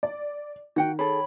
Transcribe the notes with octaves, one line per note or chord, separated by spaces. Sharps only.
D5
D#3 F#4 F#5 G5
G#4 A4 C#5 B5